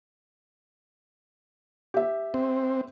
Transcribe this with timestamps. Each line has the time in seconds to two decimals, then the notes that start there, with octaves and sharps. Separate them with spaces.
1.94 G4 E5
2.34 C4